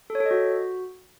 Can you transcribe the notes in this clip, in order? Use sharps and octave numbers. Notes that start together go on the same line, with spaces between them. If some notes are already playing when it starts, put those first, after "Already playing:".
A4
C#5
A4
D#5
F#4